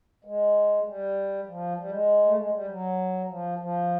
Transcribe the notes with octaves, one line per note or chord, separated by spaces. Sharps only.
G#3
G3
F3
G3
G#3
A3
G#3
G3
F#3
F3
F3